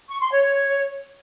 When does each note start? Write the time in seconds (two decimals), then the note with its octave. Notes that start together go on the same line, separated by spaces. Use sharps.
0.09 C#6
0.21 C6
0.32 C#5